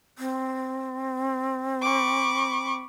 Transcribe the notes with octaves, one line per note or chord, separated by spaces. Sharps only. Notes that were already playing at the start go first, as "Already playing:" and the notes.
C4
B5 C#6 D6